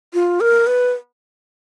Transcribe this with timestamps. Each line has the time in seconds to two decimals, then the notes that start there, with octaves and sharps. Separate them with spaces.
0.14 F4
0.41 A#4
0.67 B4